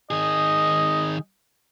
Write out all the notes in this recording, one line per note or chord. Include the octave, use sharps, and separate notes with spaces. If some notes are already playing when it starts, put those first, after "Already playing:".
D#3 G#4 D#5